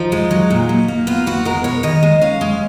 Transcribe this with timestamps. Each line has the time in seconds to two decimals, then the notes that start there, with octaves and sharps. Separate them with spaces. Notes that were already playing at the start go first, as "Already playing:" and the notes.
Already playing: F3 D#4
0.12 G#3
0.31 F#3
0.50 A#2
0.69 A#2
0.88 A#3
1.07 B3 F4
1.27 B3 F#4
1.45 G#3 A#4
1.64 B2 C#5
1.83 D#3 D#5
2.03 G#3
2.22 C#4 F5
2.41 G#3